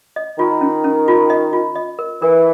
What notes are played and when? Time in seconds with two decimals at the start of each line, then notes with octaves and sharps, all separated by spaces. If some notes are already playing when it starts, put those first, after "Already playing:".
0.16 D#5
0.38 D#3 F4
0.61 C#4
0.84 C#4
1.08 F4
1.30 D#5
1.53 F4
1.75 D#5
1.99 A#4
2.22 E3 A#4